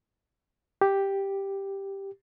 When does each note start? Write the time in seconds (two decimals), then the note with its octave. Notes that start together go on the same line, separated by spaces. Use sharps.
0.81 G4